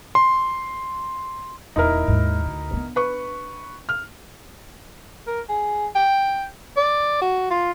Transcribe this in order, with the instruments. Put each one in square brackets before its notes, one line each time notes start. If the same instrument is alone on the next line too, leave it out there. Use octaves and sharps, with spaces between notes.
[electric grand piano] C6
[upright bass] D#1 E2 [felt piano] D#4 E4 A#4
[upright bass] D#2 G#2
D2
B3 D4
[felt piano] B4 C#6
F6
[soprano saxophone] A#4
G#4
G5
D5
F#4
F4